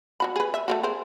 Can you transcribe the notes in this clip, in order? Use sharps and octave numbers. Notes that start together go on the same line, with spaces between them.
F#3 F#4 B5
G#4 B4
E5
A3 A#3 F#4
G#4 A#4 C5